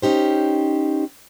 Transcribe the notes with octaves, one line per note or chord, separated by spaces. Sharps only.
C#4 D#4 G4 C5